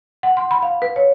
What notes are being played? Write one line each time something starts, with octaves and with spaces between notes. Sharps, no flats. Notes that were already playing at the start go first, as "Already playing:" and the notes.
F#5
C6
B5
F5
B4
C#5